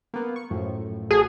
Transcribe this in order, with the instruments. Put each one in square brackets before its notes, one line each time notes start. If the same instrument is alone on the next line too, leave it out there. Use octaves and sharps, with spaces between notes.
[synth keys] A#3 B3
C#6
F#2 A2 F3
[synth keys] A1 F#4 A4 [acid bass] G#4